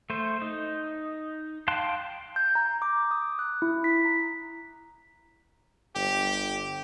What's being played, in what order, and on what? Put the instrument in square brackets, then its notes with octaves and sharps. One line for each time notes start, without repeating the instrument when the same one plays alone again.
[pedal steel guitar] A3 C5
D#4
F5 G5 A5 C6 F#6
[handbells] G6
A#5
D6
D#6
F#6
E4
B6
A#5
[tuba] G1 [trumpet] G4